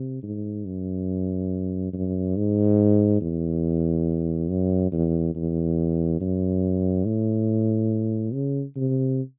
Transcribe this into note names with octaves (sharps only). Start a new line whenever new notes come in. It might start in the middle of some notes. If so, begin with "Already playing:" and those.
Already playing: C3
G#2
F#2
F#2
G#2
E2
F#2
E2
E2
F#2
A2
C#3
C3